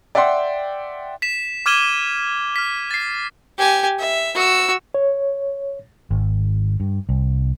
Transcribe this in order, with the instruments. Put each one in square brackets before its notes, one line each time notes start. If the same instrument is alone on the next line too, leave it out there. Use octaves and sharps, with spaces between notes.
[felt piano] D5 E5 F#5 G5 C6
[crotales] B6 E7
D6 F6 G#6 D#7 E7 G7
F6 B6
A6 C7
[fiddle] G4 G#5
E5
F#4 E6
[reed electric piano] C#5
[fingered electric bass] G#1
G2
C2